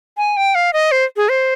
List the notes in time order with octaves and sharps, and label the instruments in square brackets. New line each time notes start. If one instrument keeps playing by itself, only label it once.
[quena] G#5
G5
F5
D#5
C5
G#4
C5